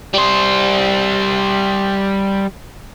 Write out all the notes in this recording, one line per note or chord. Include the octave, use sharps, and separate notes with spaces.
G3 C5